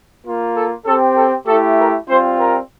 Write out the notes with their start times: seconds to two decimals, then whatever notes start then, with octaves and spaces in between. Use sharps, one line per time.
0.24 A#3 F4
0.55 A4
0.86 C4 G4 A4
1.16 A4
1.47 A3 E4 G4 A4
1.78 A#4
2.08 G3 C4 F4 C5
2.39 A#4